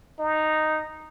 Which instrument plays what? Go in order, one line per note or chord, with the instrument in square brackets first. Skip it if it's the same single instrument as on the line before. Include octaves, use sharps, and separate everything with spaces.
[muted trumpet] D#4